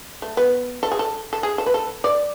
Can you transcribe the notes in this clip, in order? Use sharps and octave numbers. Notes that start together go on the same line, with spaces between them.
A3
B3
A4
G#4
A4
A4
G#4
A4
B4
A4
D5